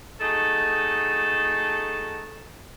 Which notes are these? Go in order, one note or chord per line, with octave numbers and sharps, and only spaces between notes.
A3 D#4 F#4 G#4 A4